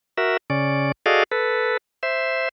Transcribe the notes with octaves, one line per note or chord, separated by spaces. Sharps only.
F#4 A#4 E5
C#3 C#4 D5
F#4 G#4 A4 D5 D#5 F5
A4 B4
C5 E5